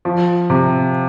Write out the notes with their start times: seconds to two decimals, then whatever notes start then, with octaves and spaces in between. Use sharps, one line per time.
0.05 F3
0.50 C3